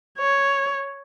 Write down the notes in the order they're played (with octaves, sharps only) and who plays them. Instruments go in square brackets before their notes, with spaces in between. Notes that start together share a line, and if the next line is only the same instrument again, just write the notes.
[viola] C#5